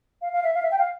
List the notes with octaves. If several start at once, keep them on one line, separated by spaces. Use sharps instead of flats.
F5
F5
E5
F5
E5
G5
F5